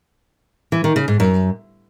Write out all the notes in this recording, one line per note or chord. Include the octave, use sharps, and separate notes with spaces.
E3
D#3
C#3
G#2
F#2